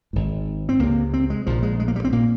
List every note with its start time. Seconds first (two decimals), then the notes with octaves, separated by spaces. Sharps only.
0.13 G#1 G#2
0.69 C4
0.79 C#2 C3 A#3
1.13 C4
1.30 G#3
1.46 A#1 A#2 F3
1.63 G#3
1.80 G#3
1.88 A#3
1.96 G3
2.04 C4
2.12 A#2 A#3